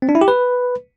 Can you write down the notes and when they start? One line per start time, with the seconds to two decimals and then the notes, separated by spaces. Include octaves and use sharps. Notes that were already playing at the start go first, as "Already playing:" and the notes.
0.02 C4
0.09 D4
0.15 E4
0.21 G4
0.28 B4